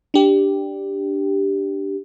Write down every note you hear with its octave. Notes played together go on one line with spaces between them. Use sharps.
D4 G4